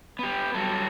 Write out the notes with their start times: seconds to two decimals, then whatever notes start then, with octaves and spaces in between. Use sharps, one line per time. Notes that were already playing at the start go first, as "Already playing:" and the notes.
0.19 B3 G4
0.54 F#3 G3 A4